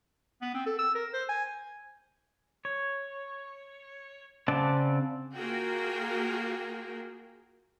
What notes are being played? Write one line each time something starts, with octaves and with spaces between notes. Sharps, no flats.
B3
C4
A4
E6
A#4
C5
G#5
C#5
C#3 C4 D5 F#5 A5
A#3 F4 F#4 G#4 A#4 G5